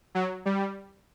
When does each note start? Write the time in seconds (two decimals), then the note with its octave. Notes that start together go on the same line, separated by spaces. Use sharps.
0.15 F#3
0.45 G3